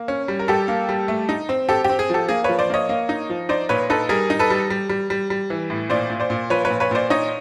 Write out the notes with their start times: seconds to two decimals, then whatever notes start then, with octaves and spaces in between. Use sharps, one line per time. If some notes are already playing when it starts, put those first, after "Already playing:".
Already playing: A#3
0.08 C#4
0.28 G3
0.39 A#4
0.48 G3 G4 A4
0.68 A#3
0.89 G3
1.08 A3
1.29 D#4
1.49 C4
1.69 C4 G4 A4
1.84 C4 G4
1.99 G#4
2.10 F3 G4 A4
2.29 A#3 G#4
2.44 F3 B4 C#5
2.59 C5 D5
2.70 A#3 C#5 D#5
2.89 A#3
3.09 D#4
3.30 F3
3.49 D#4 C5 D5
3.69 A#2 B4 C#5
3.90 D#4 A4 B4
4.09 G3 G#4 A#4
4.30 D#4
4.39 A4 B4
4.50 G3
4.70 G3
4.89 G3
5.10 G3
5.30 G3
5.50 E3
5.70 A2
5.90 A#2 C5 D5
6.10 A#2
6.20 C5 D5
6.30 A#2
6.50 F3 B4 C#5
6.65 B4 C#5
6.70 A#2
6.80 B4 C#5
6.91 A#2 C5 D5
7.10 D#4 C#5 D#5